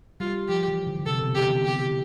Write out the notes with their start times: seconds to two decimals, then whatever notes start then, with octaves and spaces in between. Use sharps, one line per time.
0.20 G3 F4
0.48 F3 G4
0.68 E3
0.87 D3
0.99 D3
1.06 C3 A4
1.21 B2
1.35 D3 G4
1.49 E3
1.64 D3 G4